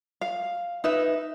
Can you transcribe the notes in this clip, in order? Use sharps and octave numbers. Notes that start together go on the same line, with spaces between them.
F5
D#4 B4 E5